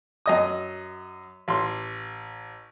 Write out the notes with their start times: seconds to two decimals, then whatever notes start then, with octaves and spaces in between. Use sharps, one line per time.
0.26 F#2 D#5 D#6
1.48 A1 C6